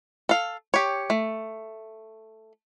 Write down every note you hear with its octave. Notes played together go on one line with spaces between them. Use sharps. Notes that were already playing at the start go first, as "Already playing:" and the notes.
A4 F5
G4 C#5
A3